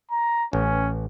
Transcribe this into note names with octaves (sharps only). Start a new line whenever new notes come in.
A#5
A1 C#4